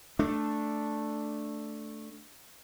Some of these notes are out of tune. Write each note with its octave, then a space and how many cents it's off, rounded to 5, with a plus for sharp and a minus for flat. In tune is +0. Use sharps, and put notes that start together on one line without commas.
A3 +0 D4 +0